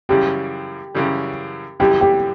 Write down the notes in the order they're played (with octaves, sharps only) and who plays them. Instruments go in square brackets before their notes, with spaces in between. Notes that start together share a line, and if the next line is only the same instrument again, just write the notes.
[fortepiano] F#2 C#3 E3 G3 [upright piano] G4
[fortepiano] F#2 C#3 E3 G3
[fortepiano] F#2 C#3 E3 G3 [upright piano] G4
[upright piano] G4